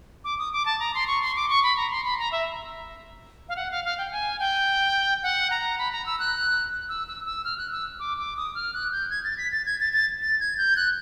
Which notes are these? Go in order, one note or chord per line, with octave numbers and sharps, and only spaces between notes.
D6
D#6
D6
A5
A#5
C6
C#6
C6
D6
C#6
B5
A#5
C6
B5
A#5
E5
F5
F#5
F5
F5
G5
G#5
G5
F#5
A#5
B5
A#5
E6
F#6
E6
E6
E6
F6
F#6
E6
D6
D6
D#6
F6
F#6
G6
G#6
A6
B6
A6
G#6
A6
A6
A6
G#6
G6
F#6